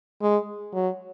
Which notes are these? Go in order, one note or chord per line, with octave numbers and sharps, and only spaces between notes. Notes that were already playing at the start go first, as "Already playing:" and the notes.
G#3
F#3